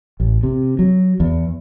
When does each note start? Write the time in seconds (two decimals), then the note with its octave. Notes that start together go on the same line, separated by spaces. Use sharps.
0.20 A1
0.43 C3
0.79 F#3
1.20 E2